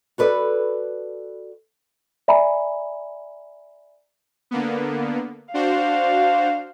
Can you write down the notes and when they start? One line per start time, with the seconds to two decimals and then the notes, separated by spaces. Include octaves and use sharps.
0.18 F#4 A4 B4 D5
2.28 D5 E5 G#5 A#5 B5
4.51 D3 A#3 B3
5.54 D4 F#4 C5 F5